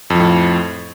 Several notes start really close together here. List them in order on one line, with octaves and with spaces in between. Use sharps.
F2 F3 A2